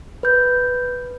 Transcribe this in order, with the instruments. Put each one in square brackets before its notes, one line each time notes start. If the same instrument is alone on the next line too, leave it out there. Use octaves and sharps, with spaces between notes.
[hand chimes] B4 G6